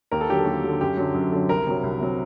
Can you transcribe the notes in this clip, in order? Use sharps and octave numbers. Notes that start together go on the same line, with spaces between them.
D#2 A#4
A4
D3 F#3 G4
A4
D#2
D3 F#3
F#2 G4
D3 F#3
F#2
D3 F#3
C2 A#4
C3 F#3
C2
C3 F#3